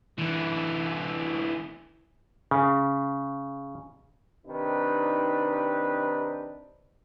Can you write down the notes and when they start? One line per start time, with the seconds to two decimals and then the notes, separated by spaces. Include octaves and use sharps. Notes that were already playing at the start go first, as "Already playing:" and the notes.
0.18 D3 E3
2.51 C#3
4.46 C3 D#3 D4 D#4 B4